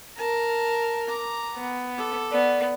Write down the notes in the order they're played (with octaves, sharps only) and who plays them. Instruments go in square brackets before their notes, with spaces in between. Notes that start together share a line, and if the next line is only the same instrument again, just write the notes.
[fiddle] A#4 [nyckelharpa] A5
[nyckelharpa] A#5 D6
[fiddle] B3
[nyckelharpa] A4 D6
[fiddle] B3 [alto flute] D5